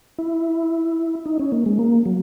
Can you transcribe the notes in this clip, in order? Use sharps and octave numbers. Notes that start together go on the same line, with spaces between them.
E4
D#4
C#4
A#3
G#3
A#3
F#3